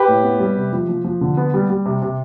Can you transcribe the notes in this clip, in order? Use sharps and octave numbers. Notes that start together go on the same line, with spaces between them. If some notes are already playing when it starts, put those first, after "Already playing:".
Already playing: G4 B4
A2
B3
G3
C3
F3
F3
F3
D3
B3
G3
G3
C3
C3